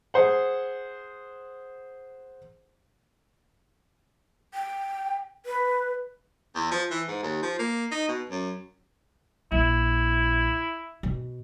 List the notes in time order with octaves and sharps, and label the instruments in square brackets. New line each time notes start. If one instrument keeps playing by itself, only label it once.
[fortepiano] G#4 C5 F#5
[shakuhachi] G5
B4
[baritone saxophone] E2
F3
E3
G#2
D#2
F3
A#3
D#4
B2
F#2
[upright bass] A#1 [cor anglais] E4
[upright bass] B2